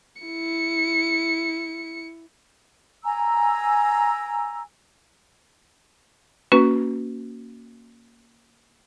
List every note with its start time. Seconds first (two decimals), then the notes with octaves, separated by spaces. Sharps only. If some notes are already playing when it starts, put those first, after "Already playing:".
0.22 E4 C#7
3.04 G#5 A#5 E6
6.52 A#3 C#4 F#4 B4